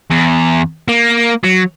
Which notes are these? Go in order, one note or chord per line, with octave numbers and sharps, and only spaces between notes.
E2
A#3
F#3